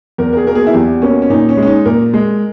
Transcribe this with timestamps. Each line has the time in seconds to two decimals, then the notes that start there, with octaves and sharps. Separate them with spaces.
0.18 E2 A#4
0.33 A#4
0.37 G#4
0.47 B2 A#3 A#4
0.55 G#4
0.67 E4
0.74 E2 G4
1.02 B2 A#3 C#4
1.22 C#4
1.30 A#2 D#4
1.49 C#4
1.57 G#3
1.62 C#4
1.67 D#4
1.86 A#2 A#4
2.14 G#3